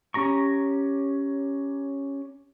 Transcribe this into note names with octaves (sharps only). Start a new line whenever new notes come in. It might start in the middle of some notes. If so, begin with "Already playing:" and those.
C#4 G4 A#5 C#6